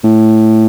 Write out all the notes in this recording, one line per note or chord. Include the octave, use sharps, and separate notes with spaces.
A2